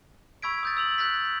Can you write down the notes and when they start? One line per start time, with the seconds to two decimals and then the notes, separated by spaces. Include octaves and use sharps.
0.42 B5 C#6 E6 G#6 B6 D7
0.63 D#6 G6 A6
0.77 E6 F7 F#7
0.98 F#6 G6 A6 B6